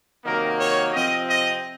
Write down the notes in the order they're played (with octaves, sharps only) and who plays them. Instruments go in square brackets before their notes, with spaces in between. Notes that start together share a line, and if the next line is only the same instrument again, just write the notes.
[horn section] C3 D#3 F#3 A#3 A#4
C#5
C3 F3 C4 D#5
D#5